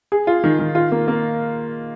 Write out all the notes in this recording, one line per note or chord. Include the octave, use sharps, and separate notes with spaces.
G#4
F4
D#3
D#3
F4
A#3
A#3